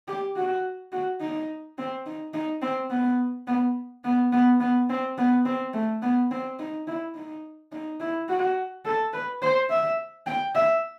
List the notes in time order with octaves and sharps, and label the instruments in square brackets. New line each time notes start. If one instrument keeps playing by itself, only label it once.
[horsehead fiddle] G4
F#4
F#4
D#4
C4
D#4
D#4
C4
B3
B3
B3
B3
B3
C4
B3
C4
A3
B3
C4
D#4
E4
D#4
D#4
E4
F#4
A4
B4
C5
E5
G5
E5